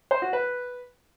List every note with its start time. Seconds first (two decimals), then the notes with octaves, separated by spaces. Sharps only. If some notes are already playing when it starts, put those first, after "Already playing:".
0.11 C5
0.22 F#4
0.33 B4